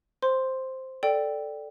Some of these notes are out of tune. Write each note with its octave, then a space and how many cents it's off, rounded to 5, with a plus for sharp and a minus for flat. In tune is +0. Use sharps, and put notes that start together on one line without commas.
C5 +0 C6 +0
A4 +0 D5 +0 G5 -5